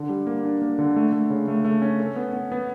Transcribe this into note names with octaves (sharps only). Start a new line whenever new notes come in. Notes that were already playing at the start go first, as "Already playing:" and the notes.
Already playing: D3
G3
A#3
D4
A#3
D3
A3
A3
C#3
A3
A3
C#4
A4
B3
B3
B3